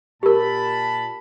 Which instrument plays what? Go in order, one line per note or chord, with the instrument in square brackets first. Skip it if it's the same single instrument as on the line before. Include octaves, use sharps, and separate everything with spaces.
[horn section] A#2 A5 B5 [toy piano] G4 A#4